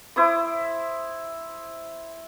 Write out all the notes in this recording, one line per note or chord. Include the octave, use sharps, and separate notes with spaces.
E4 C5 D6 D#6